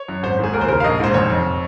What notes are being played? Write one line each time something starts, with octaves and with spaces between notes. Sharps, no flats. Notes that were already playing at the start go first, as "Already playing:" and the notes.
Already playing: C#5
F#2
G#1 C5
G#2 G#4
D#2 A#4
C5
C#3 A#4
F5
A#1 D#5
G#2 C5
F1 C#5
F2